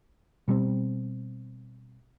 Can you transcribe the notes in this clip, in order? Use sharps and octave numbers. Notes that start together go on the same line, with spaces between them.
B2 G3 A3 C4